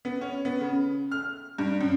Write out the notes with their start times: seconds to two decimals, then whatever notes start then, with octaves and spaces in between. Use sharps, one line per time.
0.05 B3
0.21 C#4
0.45 B3
0.60 C#3
1.12 F6
1.58 G2
1.81 F#2